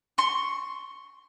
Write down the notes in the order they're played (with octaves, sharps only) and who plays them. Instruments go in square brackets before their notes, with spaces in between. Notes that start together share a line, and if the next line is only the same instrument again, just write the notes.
[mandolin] C6 C#6